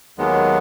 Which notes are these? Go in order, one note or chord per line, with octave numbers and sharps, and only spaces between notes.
D#2 D#3 F#3 G#3 B3